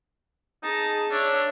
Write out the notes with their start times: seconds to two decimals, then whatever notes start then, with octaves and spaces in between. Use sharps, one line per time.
0.63 D#4 G#4 A5
1.11 D4 C#5 E5